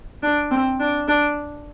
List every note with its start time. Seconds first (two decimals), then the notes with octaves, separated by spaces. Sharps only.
0.22 D4
0.51 C4
0.80 D4
1.08 D4